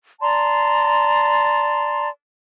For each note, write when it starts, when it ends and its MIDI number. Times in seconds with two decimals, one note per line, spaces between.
0.21 2.08 74
0.21 2.08 81
0.21 2.08 82
0.21 2.08 84